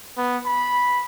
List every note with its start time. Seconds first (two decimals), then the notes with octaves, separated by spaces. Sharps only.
0.17 B3
0.46 B5